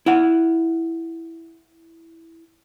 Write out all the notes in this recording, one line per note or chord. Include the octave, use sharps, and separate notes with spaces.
E4 F#5